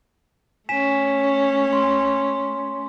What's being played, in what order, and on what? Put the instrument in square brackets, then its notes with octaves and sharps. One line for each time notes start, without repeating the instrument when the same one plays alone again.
[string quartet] A3 C#4 [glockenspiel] G#5 B6 E7
[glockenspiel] C6